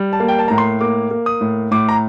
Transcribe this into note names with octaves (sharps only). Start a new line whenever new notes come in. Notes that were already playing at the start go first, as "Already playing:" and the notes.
Already playing: G3
A5
A#3
G5
A5
A2 A#5
C6
A#3 D6
A#3
D#6
A2
A2 D6
A#5